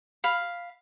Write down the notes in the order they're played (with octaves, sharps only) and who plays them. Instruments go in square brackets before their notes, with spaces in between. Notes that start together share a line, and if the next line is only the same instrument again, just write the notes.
[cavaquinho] F5 B5